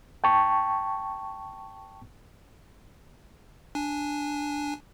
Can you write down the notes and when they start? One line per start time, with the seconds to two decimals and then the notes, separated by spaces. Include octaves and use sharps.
0.24 G5 A5 C#6
3.75 D4 G#5